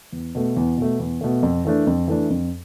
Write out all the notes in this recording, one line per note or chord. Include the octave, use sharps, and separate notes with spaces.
E2
B2 A3
E2
B2 A3
E2
B2 A3
F2
E3 A3 D4
F2
E3 A3 D4
F2